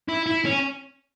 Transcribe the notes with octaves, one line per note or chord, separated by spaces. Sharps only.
E4
E4
C#4